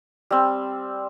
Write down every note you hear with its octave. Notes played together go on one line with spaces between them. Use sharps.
G3 C4